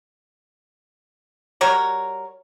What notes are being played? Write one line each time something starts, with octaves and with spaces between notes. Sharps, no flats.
G3 F#4 A#4 C#5